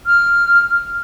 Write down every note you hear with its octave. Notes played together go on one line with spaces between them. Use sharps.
F6